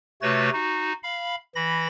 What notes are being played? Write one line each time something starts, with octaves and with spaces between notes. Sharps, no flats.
C3 A3 F#4 B4 C#5 A6
D#4 F#4
F5 B5
E3 B5 A#6